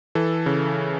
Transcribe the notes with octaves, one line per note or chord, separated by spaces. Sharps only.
E3 A4
C#3